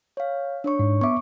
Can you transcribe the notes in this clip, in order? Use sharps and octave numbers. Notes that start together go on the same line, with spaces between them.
C#5 F5
D4 C#5 C#6
G#2
B3 E5 C#6 D6